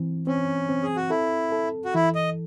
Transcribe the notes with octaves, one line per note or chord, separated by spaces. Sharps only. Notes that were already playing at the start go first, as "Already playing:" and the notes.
Already playing: E3 C4
C4 C#4
C4
G#4
F#4
E4 A4
A4
F#4
E3 E4
D#5